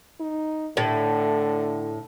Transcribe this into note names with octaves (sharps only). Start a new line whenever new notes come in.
D#4
A2 D3